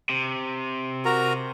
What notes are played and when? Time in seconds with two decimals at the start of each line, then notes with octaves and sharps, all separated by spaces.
0.10 C3
1.05 F#4 A#4 A#5